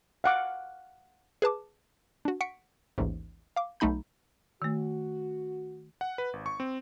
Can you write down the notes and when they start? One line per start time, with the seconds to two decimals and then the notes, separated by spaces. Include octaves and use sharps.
0.24 F5 F#5 D6
1.42 G#4 B4 A5 D6
2.25 D4 F#4
2.41 F#5 C#6 B6 C#7 D7
2.98 A1 D#2 G#2
3.56 F5 D6
3.80 B1 A3 D#4 B5 G6
4.62 D#3 A3 F#4
6.01 F#5
6.18 B4
6.33 G#1
6.46 C#6
6.60 C4